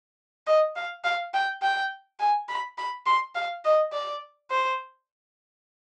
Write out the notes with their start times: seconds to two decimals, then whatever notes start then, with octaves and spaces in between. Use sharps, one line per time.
0.47 D#5
0.76 F5
1.04 F5
1.34 G5
1.62 G5
2.20 G#5
2.49 B5
2.78 B5
3.06 C6
3.35 F5
3.65 D#5
3.93 D5
4.51 C5